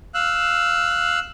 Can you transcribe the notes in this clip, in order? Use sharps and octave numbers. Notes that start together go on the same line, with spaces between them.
F5 E6 F#6